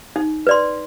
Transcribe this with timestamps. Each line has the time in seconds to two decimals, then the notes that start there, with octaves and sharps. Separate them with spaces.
0.16 D#4
0.47 B4 D5 C6